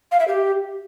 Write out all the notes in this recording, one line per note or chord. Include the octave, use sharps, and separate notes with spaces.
F5
E5
G4